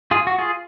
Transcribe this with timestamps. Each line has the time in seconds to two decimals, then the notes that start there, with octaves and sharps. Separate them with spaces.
0.11 F4 G#4
0.27 F#4
0.38 F4 G#4